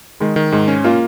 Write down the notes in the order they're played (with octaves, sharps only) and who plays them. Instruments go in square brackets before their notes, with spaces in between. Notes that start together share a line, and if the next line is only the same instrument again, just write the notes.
[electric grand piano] D#3 [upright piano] G#3
[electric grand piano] D#3
[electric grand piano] G#2 [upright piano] G#3
[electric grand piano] C#4
[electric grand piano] A#3 [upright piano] F4